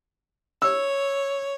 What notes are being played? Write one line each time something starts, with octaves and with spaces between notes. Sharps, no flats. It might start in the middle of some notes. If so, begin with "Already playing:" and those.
C#5 E6